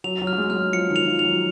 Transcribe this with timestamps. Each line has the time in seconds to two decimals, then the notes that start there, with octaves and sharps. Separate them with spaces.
0.04 F#3 F7
0.22 F#3
0.27 F6
0.33 F#3
0.38 G#3
0.50 G#3 F6
0.56 F#3
0.73 F3 C#7
0.90 D#3
0.96 F7
1.07 F3
1.19 F7
1.25 F#3